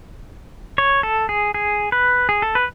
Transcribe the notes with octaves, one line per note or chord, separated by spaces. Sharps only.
C#5
A4
G#4
G#4
B4
G#4
A4
B4